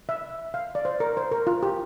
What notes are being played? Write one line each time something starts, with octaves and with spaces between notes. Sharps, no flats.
E5
F5
D5
C5
A#4
C5
A#4
F4
G4